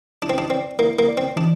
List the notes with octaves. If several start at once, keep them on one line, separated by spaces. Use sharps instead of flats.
D4 E4
C4
D4
C4 D5
A#3 E4
A#3
D5
C4
E3 D4